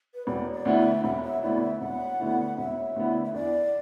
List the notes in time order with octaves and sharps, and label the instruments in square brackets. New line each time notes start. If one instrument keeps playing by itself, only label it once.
[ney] B4
[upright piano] E1 [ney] D5
[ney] D5
[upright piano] D2 D3 B3 E4
[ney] E5
[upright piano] E1 [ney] F#5
[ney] E5
[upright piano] D2 D3 B3 E4 [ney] D5
[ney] E5
[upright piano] E1 [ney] F#5
[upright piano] D2 D3 B3 E4
[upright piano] E1 [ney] E5
[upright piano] D2 D3 B3 E4
[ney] E5
[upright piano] E2 [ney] D5